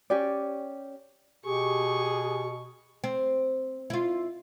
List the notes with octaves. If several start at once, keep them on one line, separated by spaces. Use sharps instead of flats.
C#4 G4 D5
B2 G4 G#4 C#6
C4
E4 F4